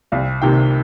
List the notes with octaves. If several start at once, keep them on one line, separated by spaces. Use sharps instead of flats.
C2 F5
C3 D#3 A#3 G5